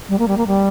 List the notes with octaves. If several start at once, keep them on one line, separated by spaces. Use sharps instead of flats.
G3
A#3
G3
A#3
G3